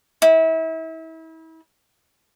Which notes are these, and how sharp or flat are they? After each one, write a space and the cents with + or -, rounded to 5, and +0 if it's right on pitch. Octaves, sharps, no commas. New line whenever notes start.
E4 -35